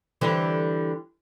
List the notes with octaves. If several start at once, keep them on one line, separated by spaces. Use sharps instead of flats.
D3 E3 G3